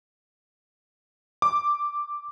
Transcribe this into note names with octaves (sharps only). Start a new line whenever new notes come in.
D6